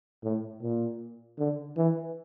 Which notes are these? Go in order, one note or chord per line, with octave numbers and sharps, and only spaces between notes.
A2
A#2
D3
E3